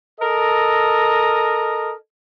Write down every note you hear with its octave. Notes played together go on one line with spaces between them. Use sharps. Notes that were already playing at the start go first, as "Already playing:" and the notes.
A4 A#4 D#5